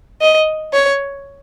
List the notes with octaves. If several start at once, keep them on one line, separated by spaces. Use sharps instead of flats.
D#5
C#5